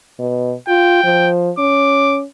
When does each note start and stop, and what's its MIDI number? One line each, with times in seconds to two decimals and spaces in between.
0.19 0.54 47
0.69 1.02 65
0.69 1.30 79
1.04 1.51 53
1.59 2.24 61
1.59 2.20 86